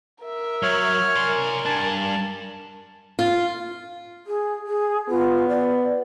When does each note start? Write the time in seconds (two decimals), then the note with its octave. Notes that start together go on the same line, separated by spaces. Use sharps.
0.24 A#4 E5
0.63 F#3 C#5 F6
1.16 A#4 D5 G#5 C6
1.66 G2 D4 A5
3.19 F4
4.26 G#4
4.65 G#4
5.09 B3 F4
5.48 D5